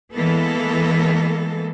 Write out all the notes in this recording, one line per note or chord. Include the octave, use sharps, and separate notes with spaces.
E3 G#3 A#3 B3 A4